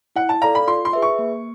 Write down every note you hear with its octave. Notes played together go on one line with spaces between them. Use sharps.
E4 F#5
A5
A4 D5 F5 A#5
B5
F4 C6
C6
G#4 B4 E5
C#6
A#3